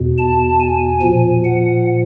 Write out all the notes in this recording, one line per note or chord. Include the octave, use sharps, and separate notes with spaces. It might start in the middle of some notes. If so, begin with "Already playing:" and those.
Already playing: E2 B2
A5
G#5
A#2 F3
F#5